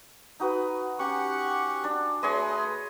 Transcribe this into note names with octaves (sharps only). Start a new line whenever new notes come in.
D#4 F#4 B4
C#4 G4 F#5 C#6
D4
A3 G#4 B4 C#5 D#5 C6